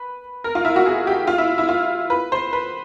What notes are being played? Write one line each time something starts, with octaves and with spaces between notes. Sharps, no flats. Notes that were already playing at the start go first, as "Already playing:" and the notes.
Already playing: B4
A#4
F4
E4
F#4
G#4
G4
F4
E4
E4
F4
B4
C5
B4